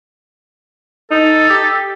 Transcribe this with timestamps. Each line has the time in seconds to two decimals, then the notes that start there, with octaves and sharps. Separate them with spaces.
1.11 D#4 A4
1.50 G4